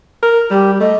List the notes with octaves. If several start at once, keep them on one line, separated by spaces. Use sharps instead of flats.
A#4
G3 G4
A3 D#5